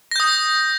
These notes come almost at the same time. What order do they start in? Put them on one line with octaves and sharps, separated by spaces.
A#6 G6 D#6